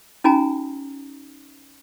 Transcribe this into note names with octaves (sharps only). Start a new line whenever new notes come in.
C#4 D#4 F#4 G#5 A#5